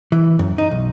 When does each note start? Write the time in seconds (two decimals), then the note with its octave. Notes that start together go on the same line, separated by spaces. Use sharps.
0.12 E3
0.39 F#2
0.58 D#4
0.71 B1